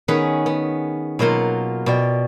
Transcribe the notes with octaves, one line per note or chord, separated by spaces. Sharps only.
D#3 B3 C#4 G#4 B4 C#5
B3
B2 F#3 A#3 F4 F#5
B2 D5 G5